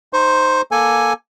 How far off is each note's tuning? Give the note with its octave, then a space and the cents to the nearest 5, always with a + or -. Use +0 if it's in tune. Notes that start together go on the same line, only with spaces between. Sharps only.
D#4 -5 C5 +0 C#6 -35
A#3 +15 A4 +0 G#5 +0